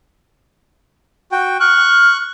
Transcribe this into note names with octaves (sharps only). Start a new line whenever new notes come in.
F#4 G5
C#6 F6 F#6